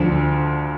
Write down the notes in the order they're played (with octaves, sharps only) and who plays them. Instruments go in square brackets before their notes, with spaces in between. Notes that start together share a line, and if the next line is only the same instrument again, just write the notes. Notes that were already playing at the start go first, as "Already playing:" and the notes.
Already playing: [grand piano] D2 D3 F3